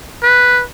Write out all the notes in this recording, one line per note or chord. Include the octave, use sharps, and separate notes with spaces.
B4